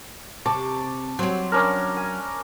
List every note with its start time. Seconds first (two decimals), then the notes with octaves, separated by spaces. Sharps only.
0.46 C3 A5 C#6 D6
1.19 F#3 C4 C5
1.52 C#4 D4 A#4
1.97 G#5